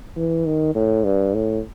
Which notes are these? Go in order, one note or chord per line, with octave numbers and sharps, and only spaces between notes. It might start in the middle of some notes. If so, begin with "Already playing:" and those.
E3
D#3
A2
G2
A2